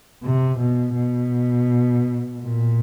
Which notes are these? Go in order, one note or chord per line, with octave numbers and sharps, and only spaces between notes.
C3
B2
B2
A#2